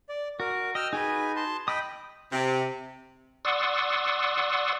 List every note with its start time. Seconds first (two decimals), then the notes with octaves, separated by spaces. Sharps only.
0.09 D5
0.40 F#4 A#4
0.75 D#5 G5 E6 F6
0.93 D#4 F#4 G#4 B4 G#5
1.36 A5 C6
1.68 D#5 G5 B5 D#6 E6 G6
2.32 C3
3.45 D5 F#5 C6 C#6 D#6 E6